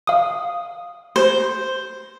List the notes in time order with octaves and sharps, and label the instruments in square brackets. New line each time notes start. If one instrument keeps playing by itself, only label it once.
[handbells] F5 D#6
[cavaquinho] C5